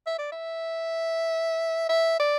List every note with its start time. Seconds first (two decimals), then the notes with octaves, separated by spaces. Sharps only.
0.07 E5
0.19 D5
0.32 E5
1.89 E5
2.20 D5